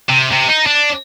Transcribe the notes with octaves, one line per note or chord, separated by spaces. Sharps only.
C3
C3
D#4
D4